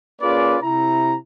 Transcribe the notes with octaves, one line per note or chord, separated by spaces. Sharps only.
A#3 C#4 F4 G#4 B4 D5
C3 E4 A#5